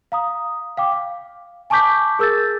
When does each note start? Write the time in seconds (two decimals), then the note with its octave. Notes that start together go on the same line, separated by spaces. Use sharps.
0.12 F5 A#5 D#6
0.77 F5 G5 D6
0.92 F5
1.70 G#5 A5 C#6 D6 G6 B6
2.19 G#4 A#4 E6 G6 A6